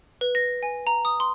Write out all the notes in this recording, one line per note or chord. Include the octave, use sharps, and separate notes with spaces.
B4
A#6
G#5
A#5
D#6
C6